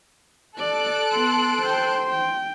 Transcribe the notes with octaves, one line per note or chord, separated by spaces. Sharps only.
A4 D5 F#6 D7
B3 C6
C5 G5
G5